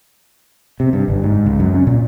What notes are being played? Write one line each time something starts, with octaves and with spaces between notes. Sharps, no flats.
C3
G2
G1
G#2
C#2
F#2
C#4
A#2